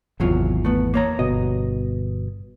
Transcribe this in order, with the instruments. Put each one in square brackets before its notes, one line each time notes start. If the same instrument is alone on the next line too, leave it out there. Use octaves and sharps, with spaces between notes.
[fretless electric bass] G#1 E2 [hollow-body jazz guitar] C3 F#3 F4
[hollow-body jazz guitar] A3 B3
A#3 C#5 A#5
[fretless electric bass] G1 B2 [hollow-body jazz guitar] D#5